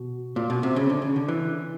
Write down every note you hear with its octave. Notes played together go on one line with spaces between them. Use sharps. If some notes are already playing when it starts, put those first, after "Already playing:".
Already playing: B2
A#2
B2
C3
C#3
D3
C#3
D3
E3